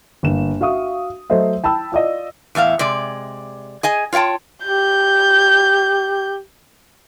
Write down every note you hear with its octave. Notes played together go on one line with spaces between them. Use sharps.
G1 A#3 E7
F#4 E5 F5 C#6 D#6
F#3 A3 C5 D#5 E5
G5 A5 B5 E6
F4 D5 D#5
E2 A2 E5 F5
C3 G#3 D5
G#4 D#5 G#5
F4 C#5 F5 G5 A5
G4 G6